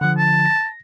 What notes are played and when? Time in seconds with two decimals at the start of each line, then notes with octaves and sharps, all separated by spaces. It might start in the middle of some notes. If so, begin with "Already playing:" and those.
0.01 D3 F3 F#5
0.18 A5
0.46 A#6